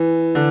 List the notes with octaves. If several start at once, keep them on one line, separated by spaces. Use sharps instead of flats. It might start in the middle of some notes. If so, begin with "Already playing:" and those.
Already playing: E3
D3